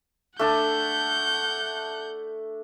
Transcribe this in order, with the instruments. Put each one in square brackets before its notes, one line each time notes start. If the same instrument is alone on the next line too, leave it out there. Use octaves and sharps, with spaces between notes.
[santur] A3 D4 A5 [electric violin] F#5 G6